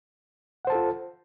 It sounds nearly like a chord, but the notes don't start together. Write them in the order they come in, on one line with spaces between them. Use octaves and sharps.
F#5 C5 A5 A4 F4